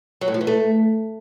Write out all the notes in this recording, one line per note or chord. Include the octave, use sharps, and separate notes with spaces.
F#3
A2
F3
E3
A3